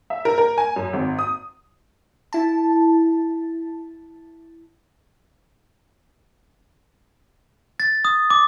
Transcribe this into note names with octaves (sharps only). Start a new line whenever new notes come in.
E5
A#4
A#4
G#5
F#2
G#1
D#6
E4 A5
A6
D#6
D6